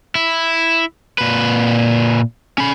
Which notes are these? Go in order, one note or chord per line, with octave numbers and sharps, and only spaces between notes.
E4
A#2 B4
C#4 B5